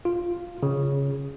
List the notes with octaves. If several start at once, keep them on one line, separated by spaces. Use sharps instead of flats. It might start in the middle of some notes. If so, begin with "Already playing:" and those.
F4
C#3